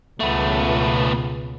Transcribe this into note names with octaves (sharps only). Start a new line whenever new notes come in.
C#2 B2 A3 B3